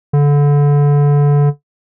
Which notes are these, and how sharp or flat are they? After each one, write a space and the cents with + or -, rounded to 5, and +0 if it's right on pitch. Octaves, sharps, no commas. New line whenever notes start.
D3 -25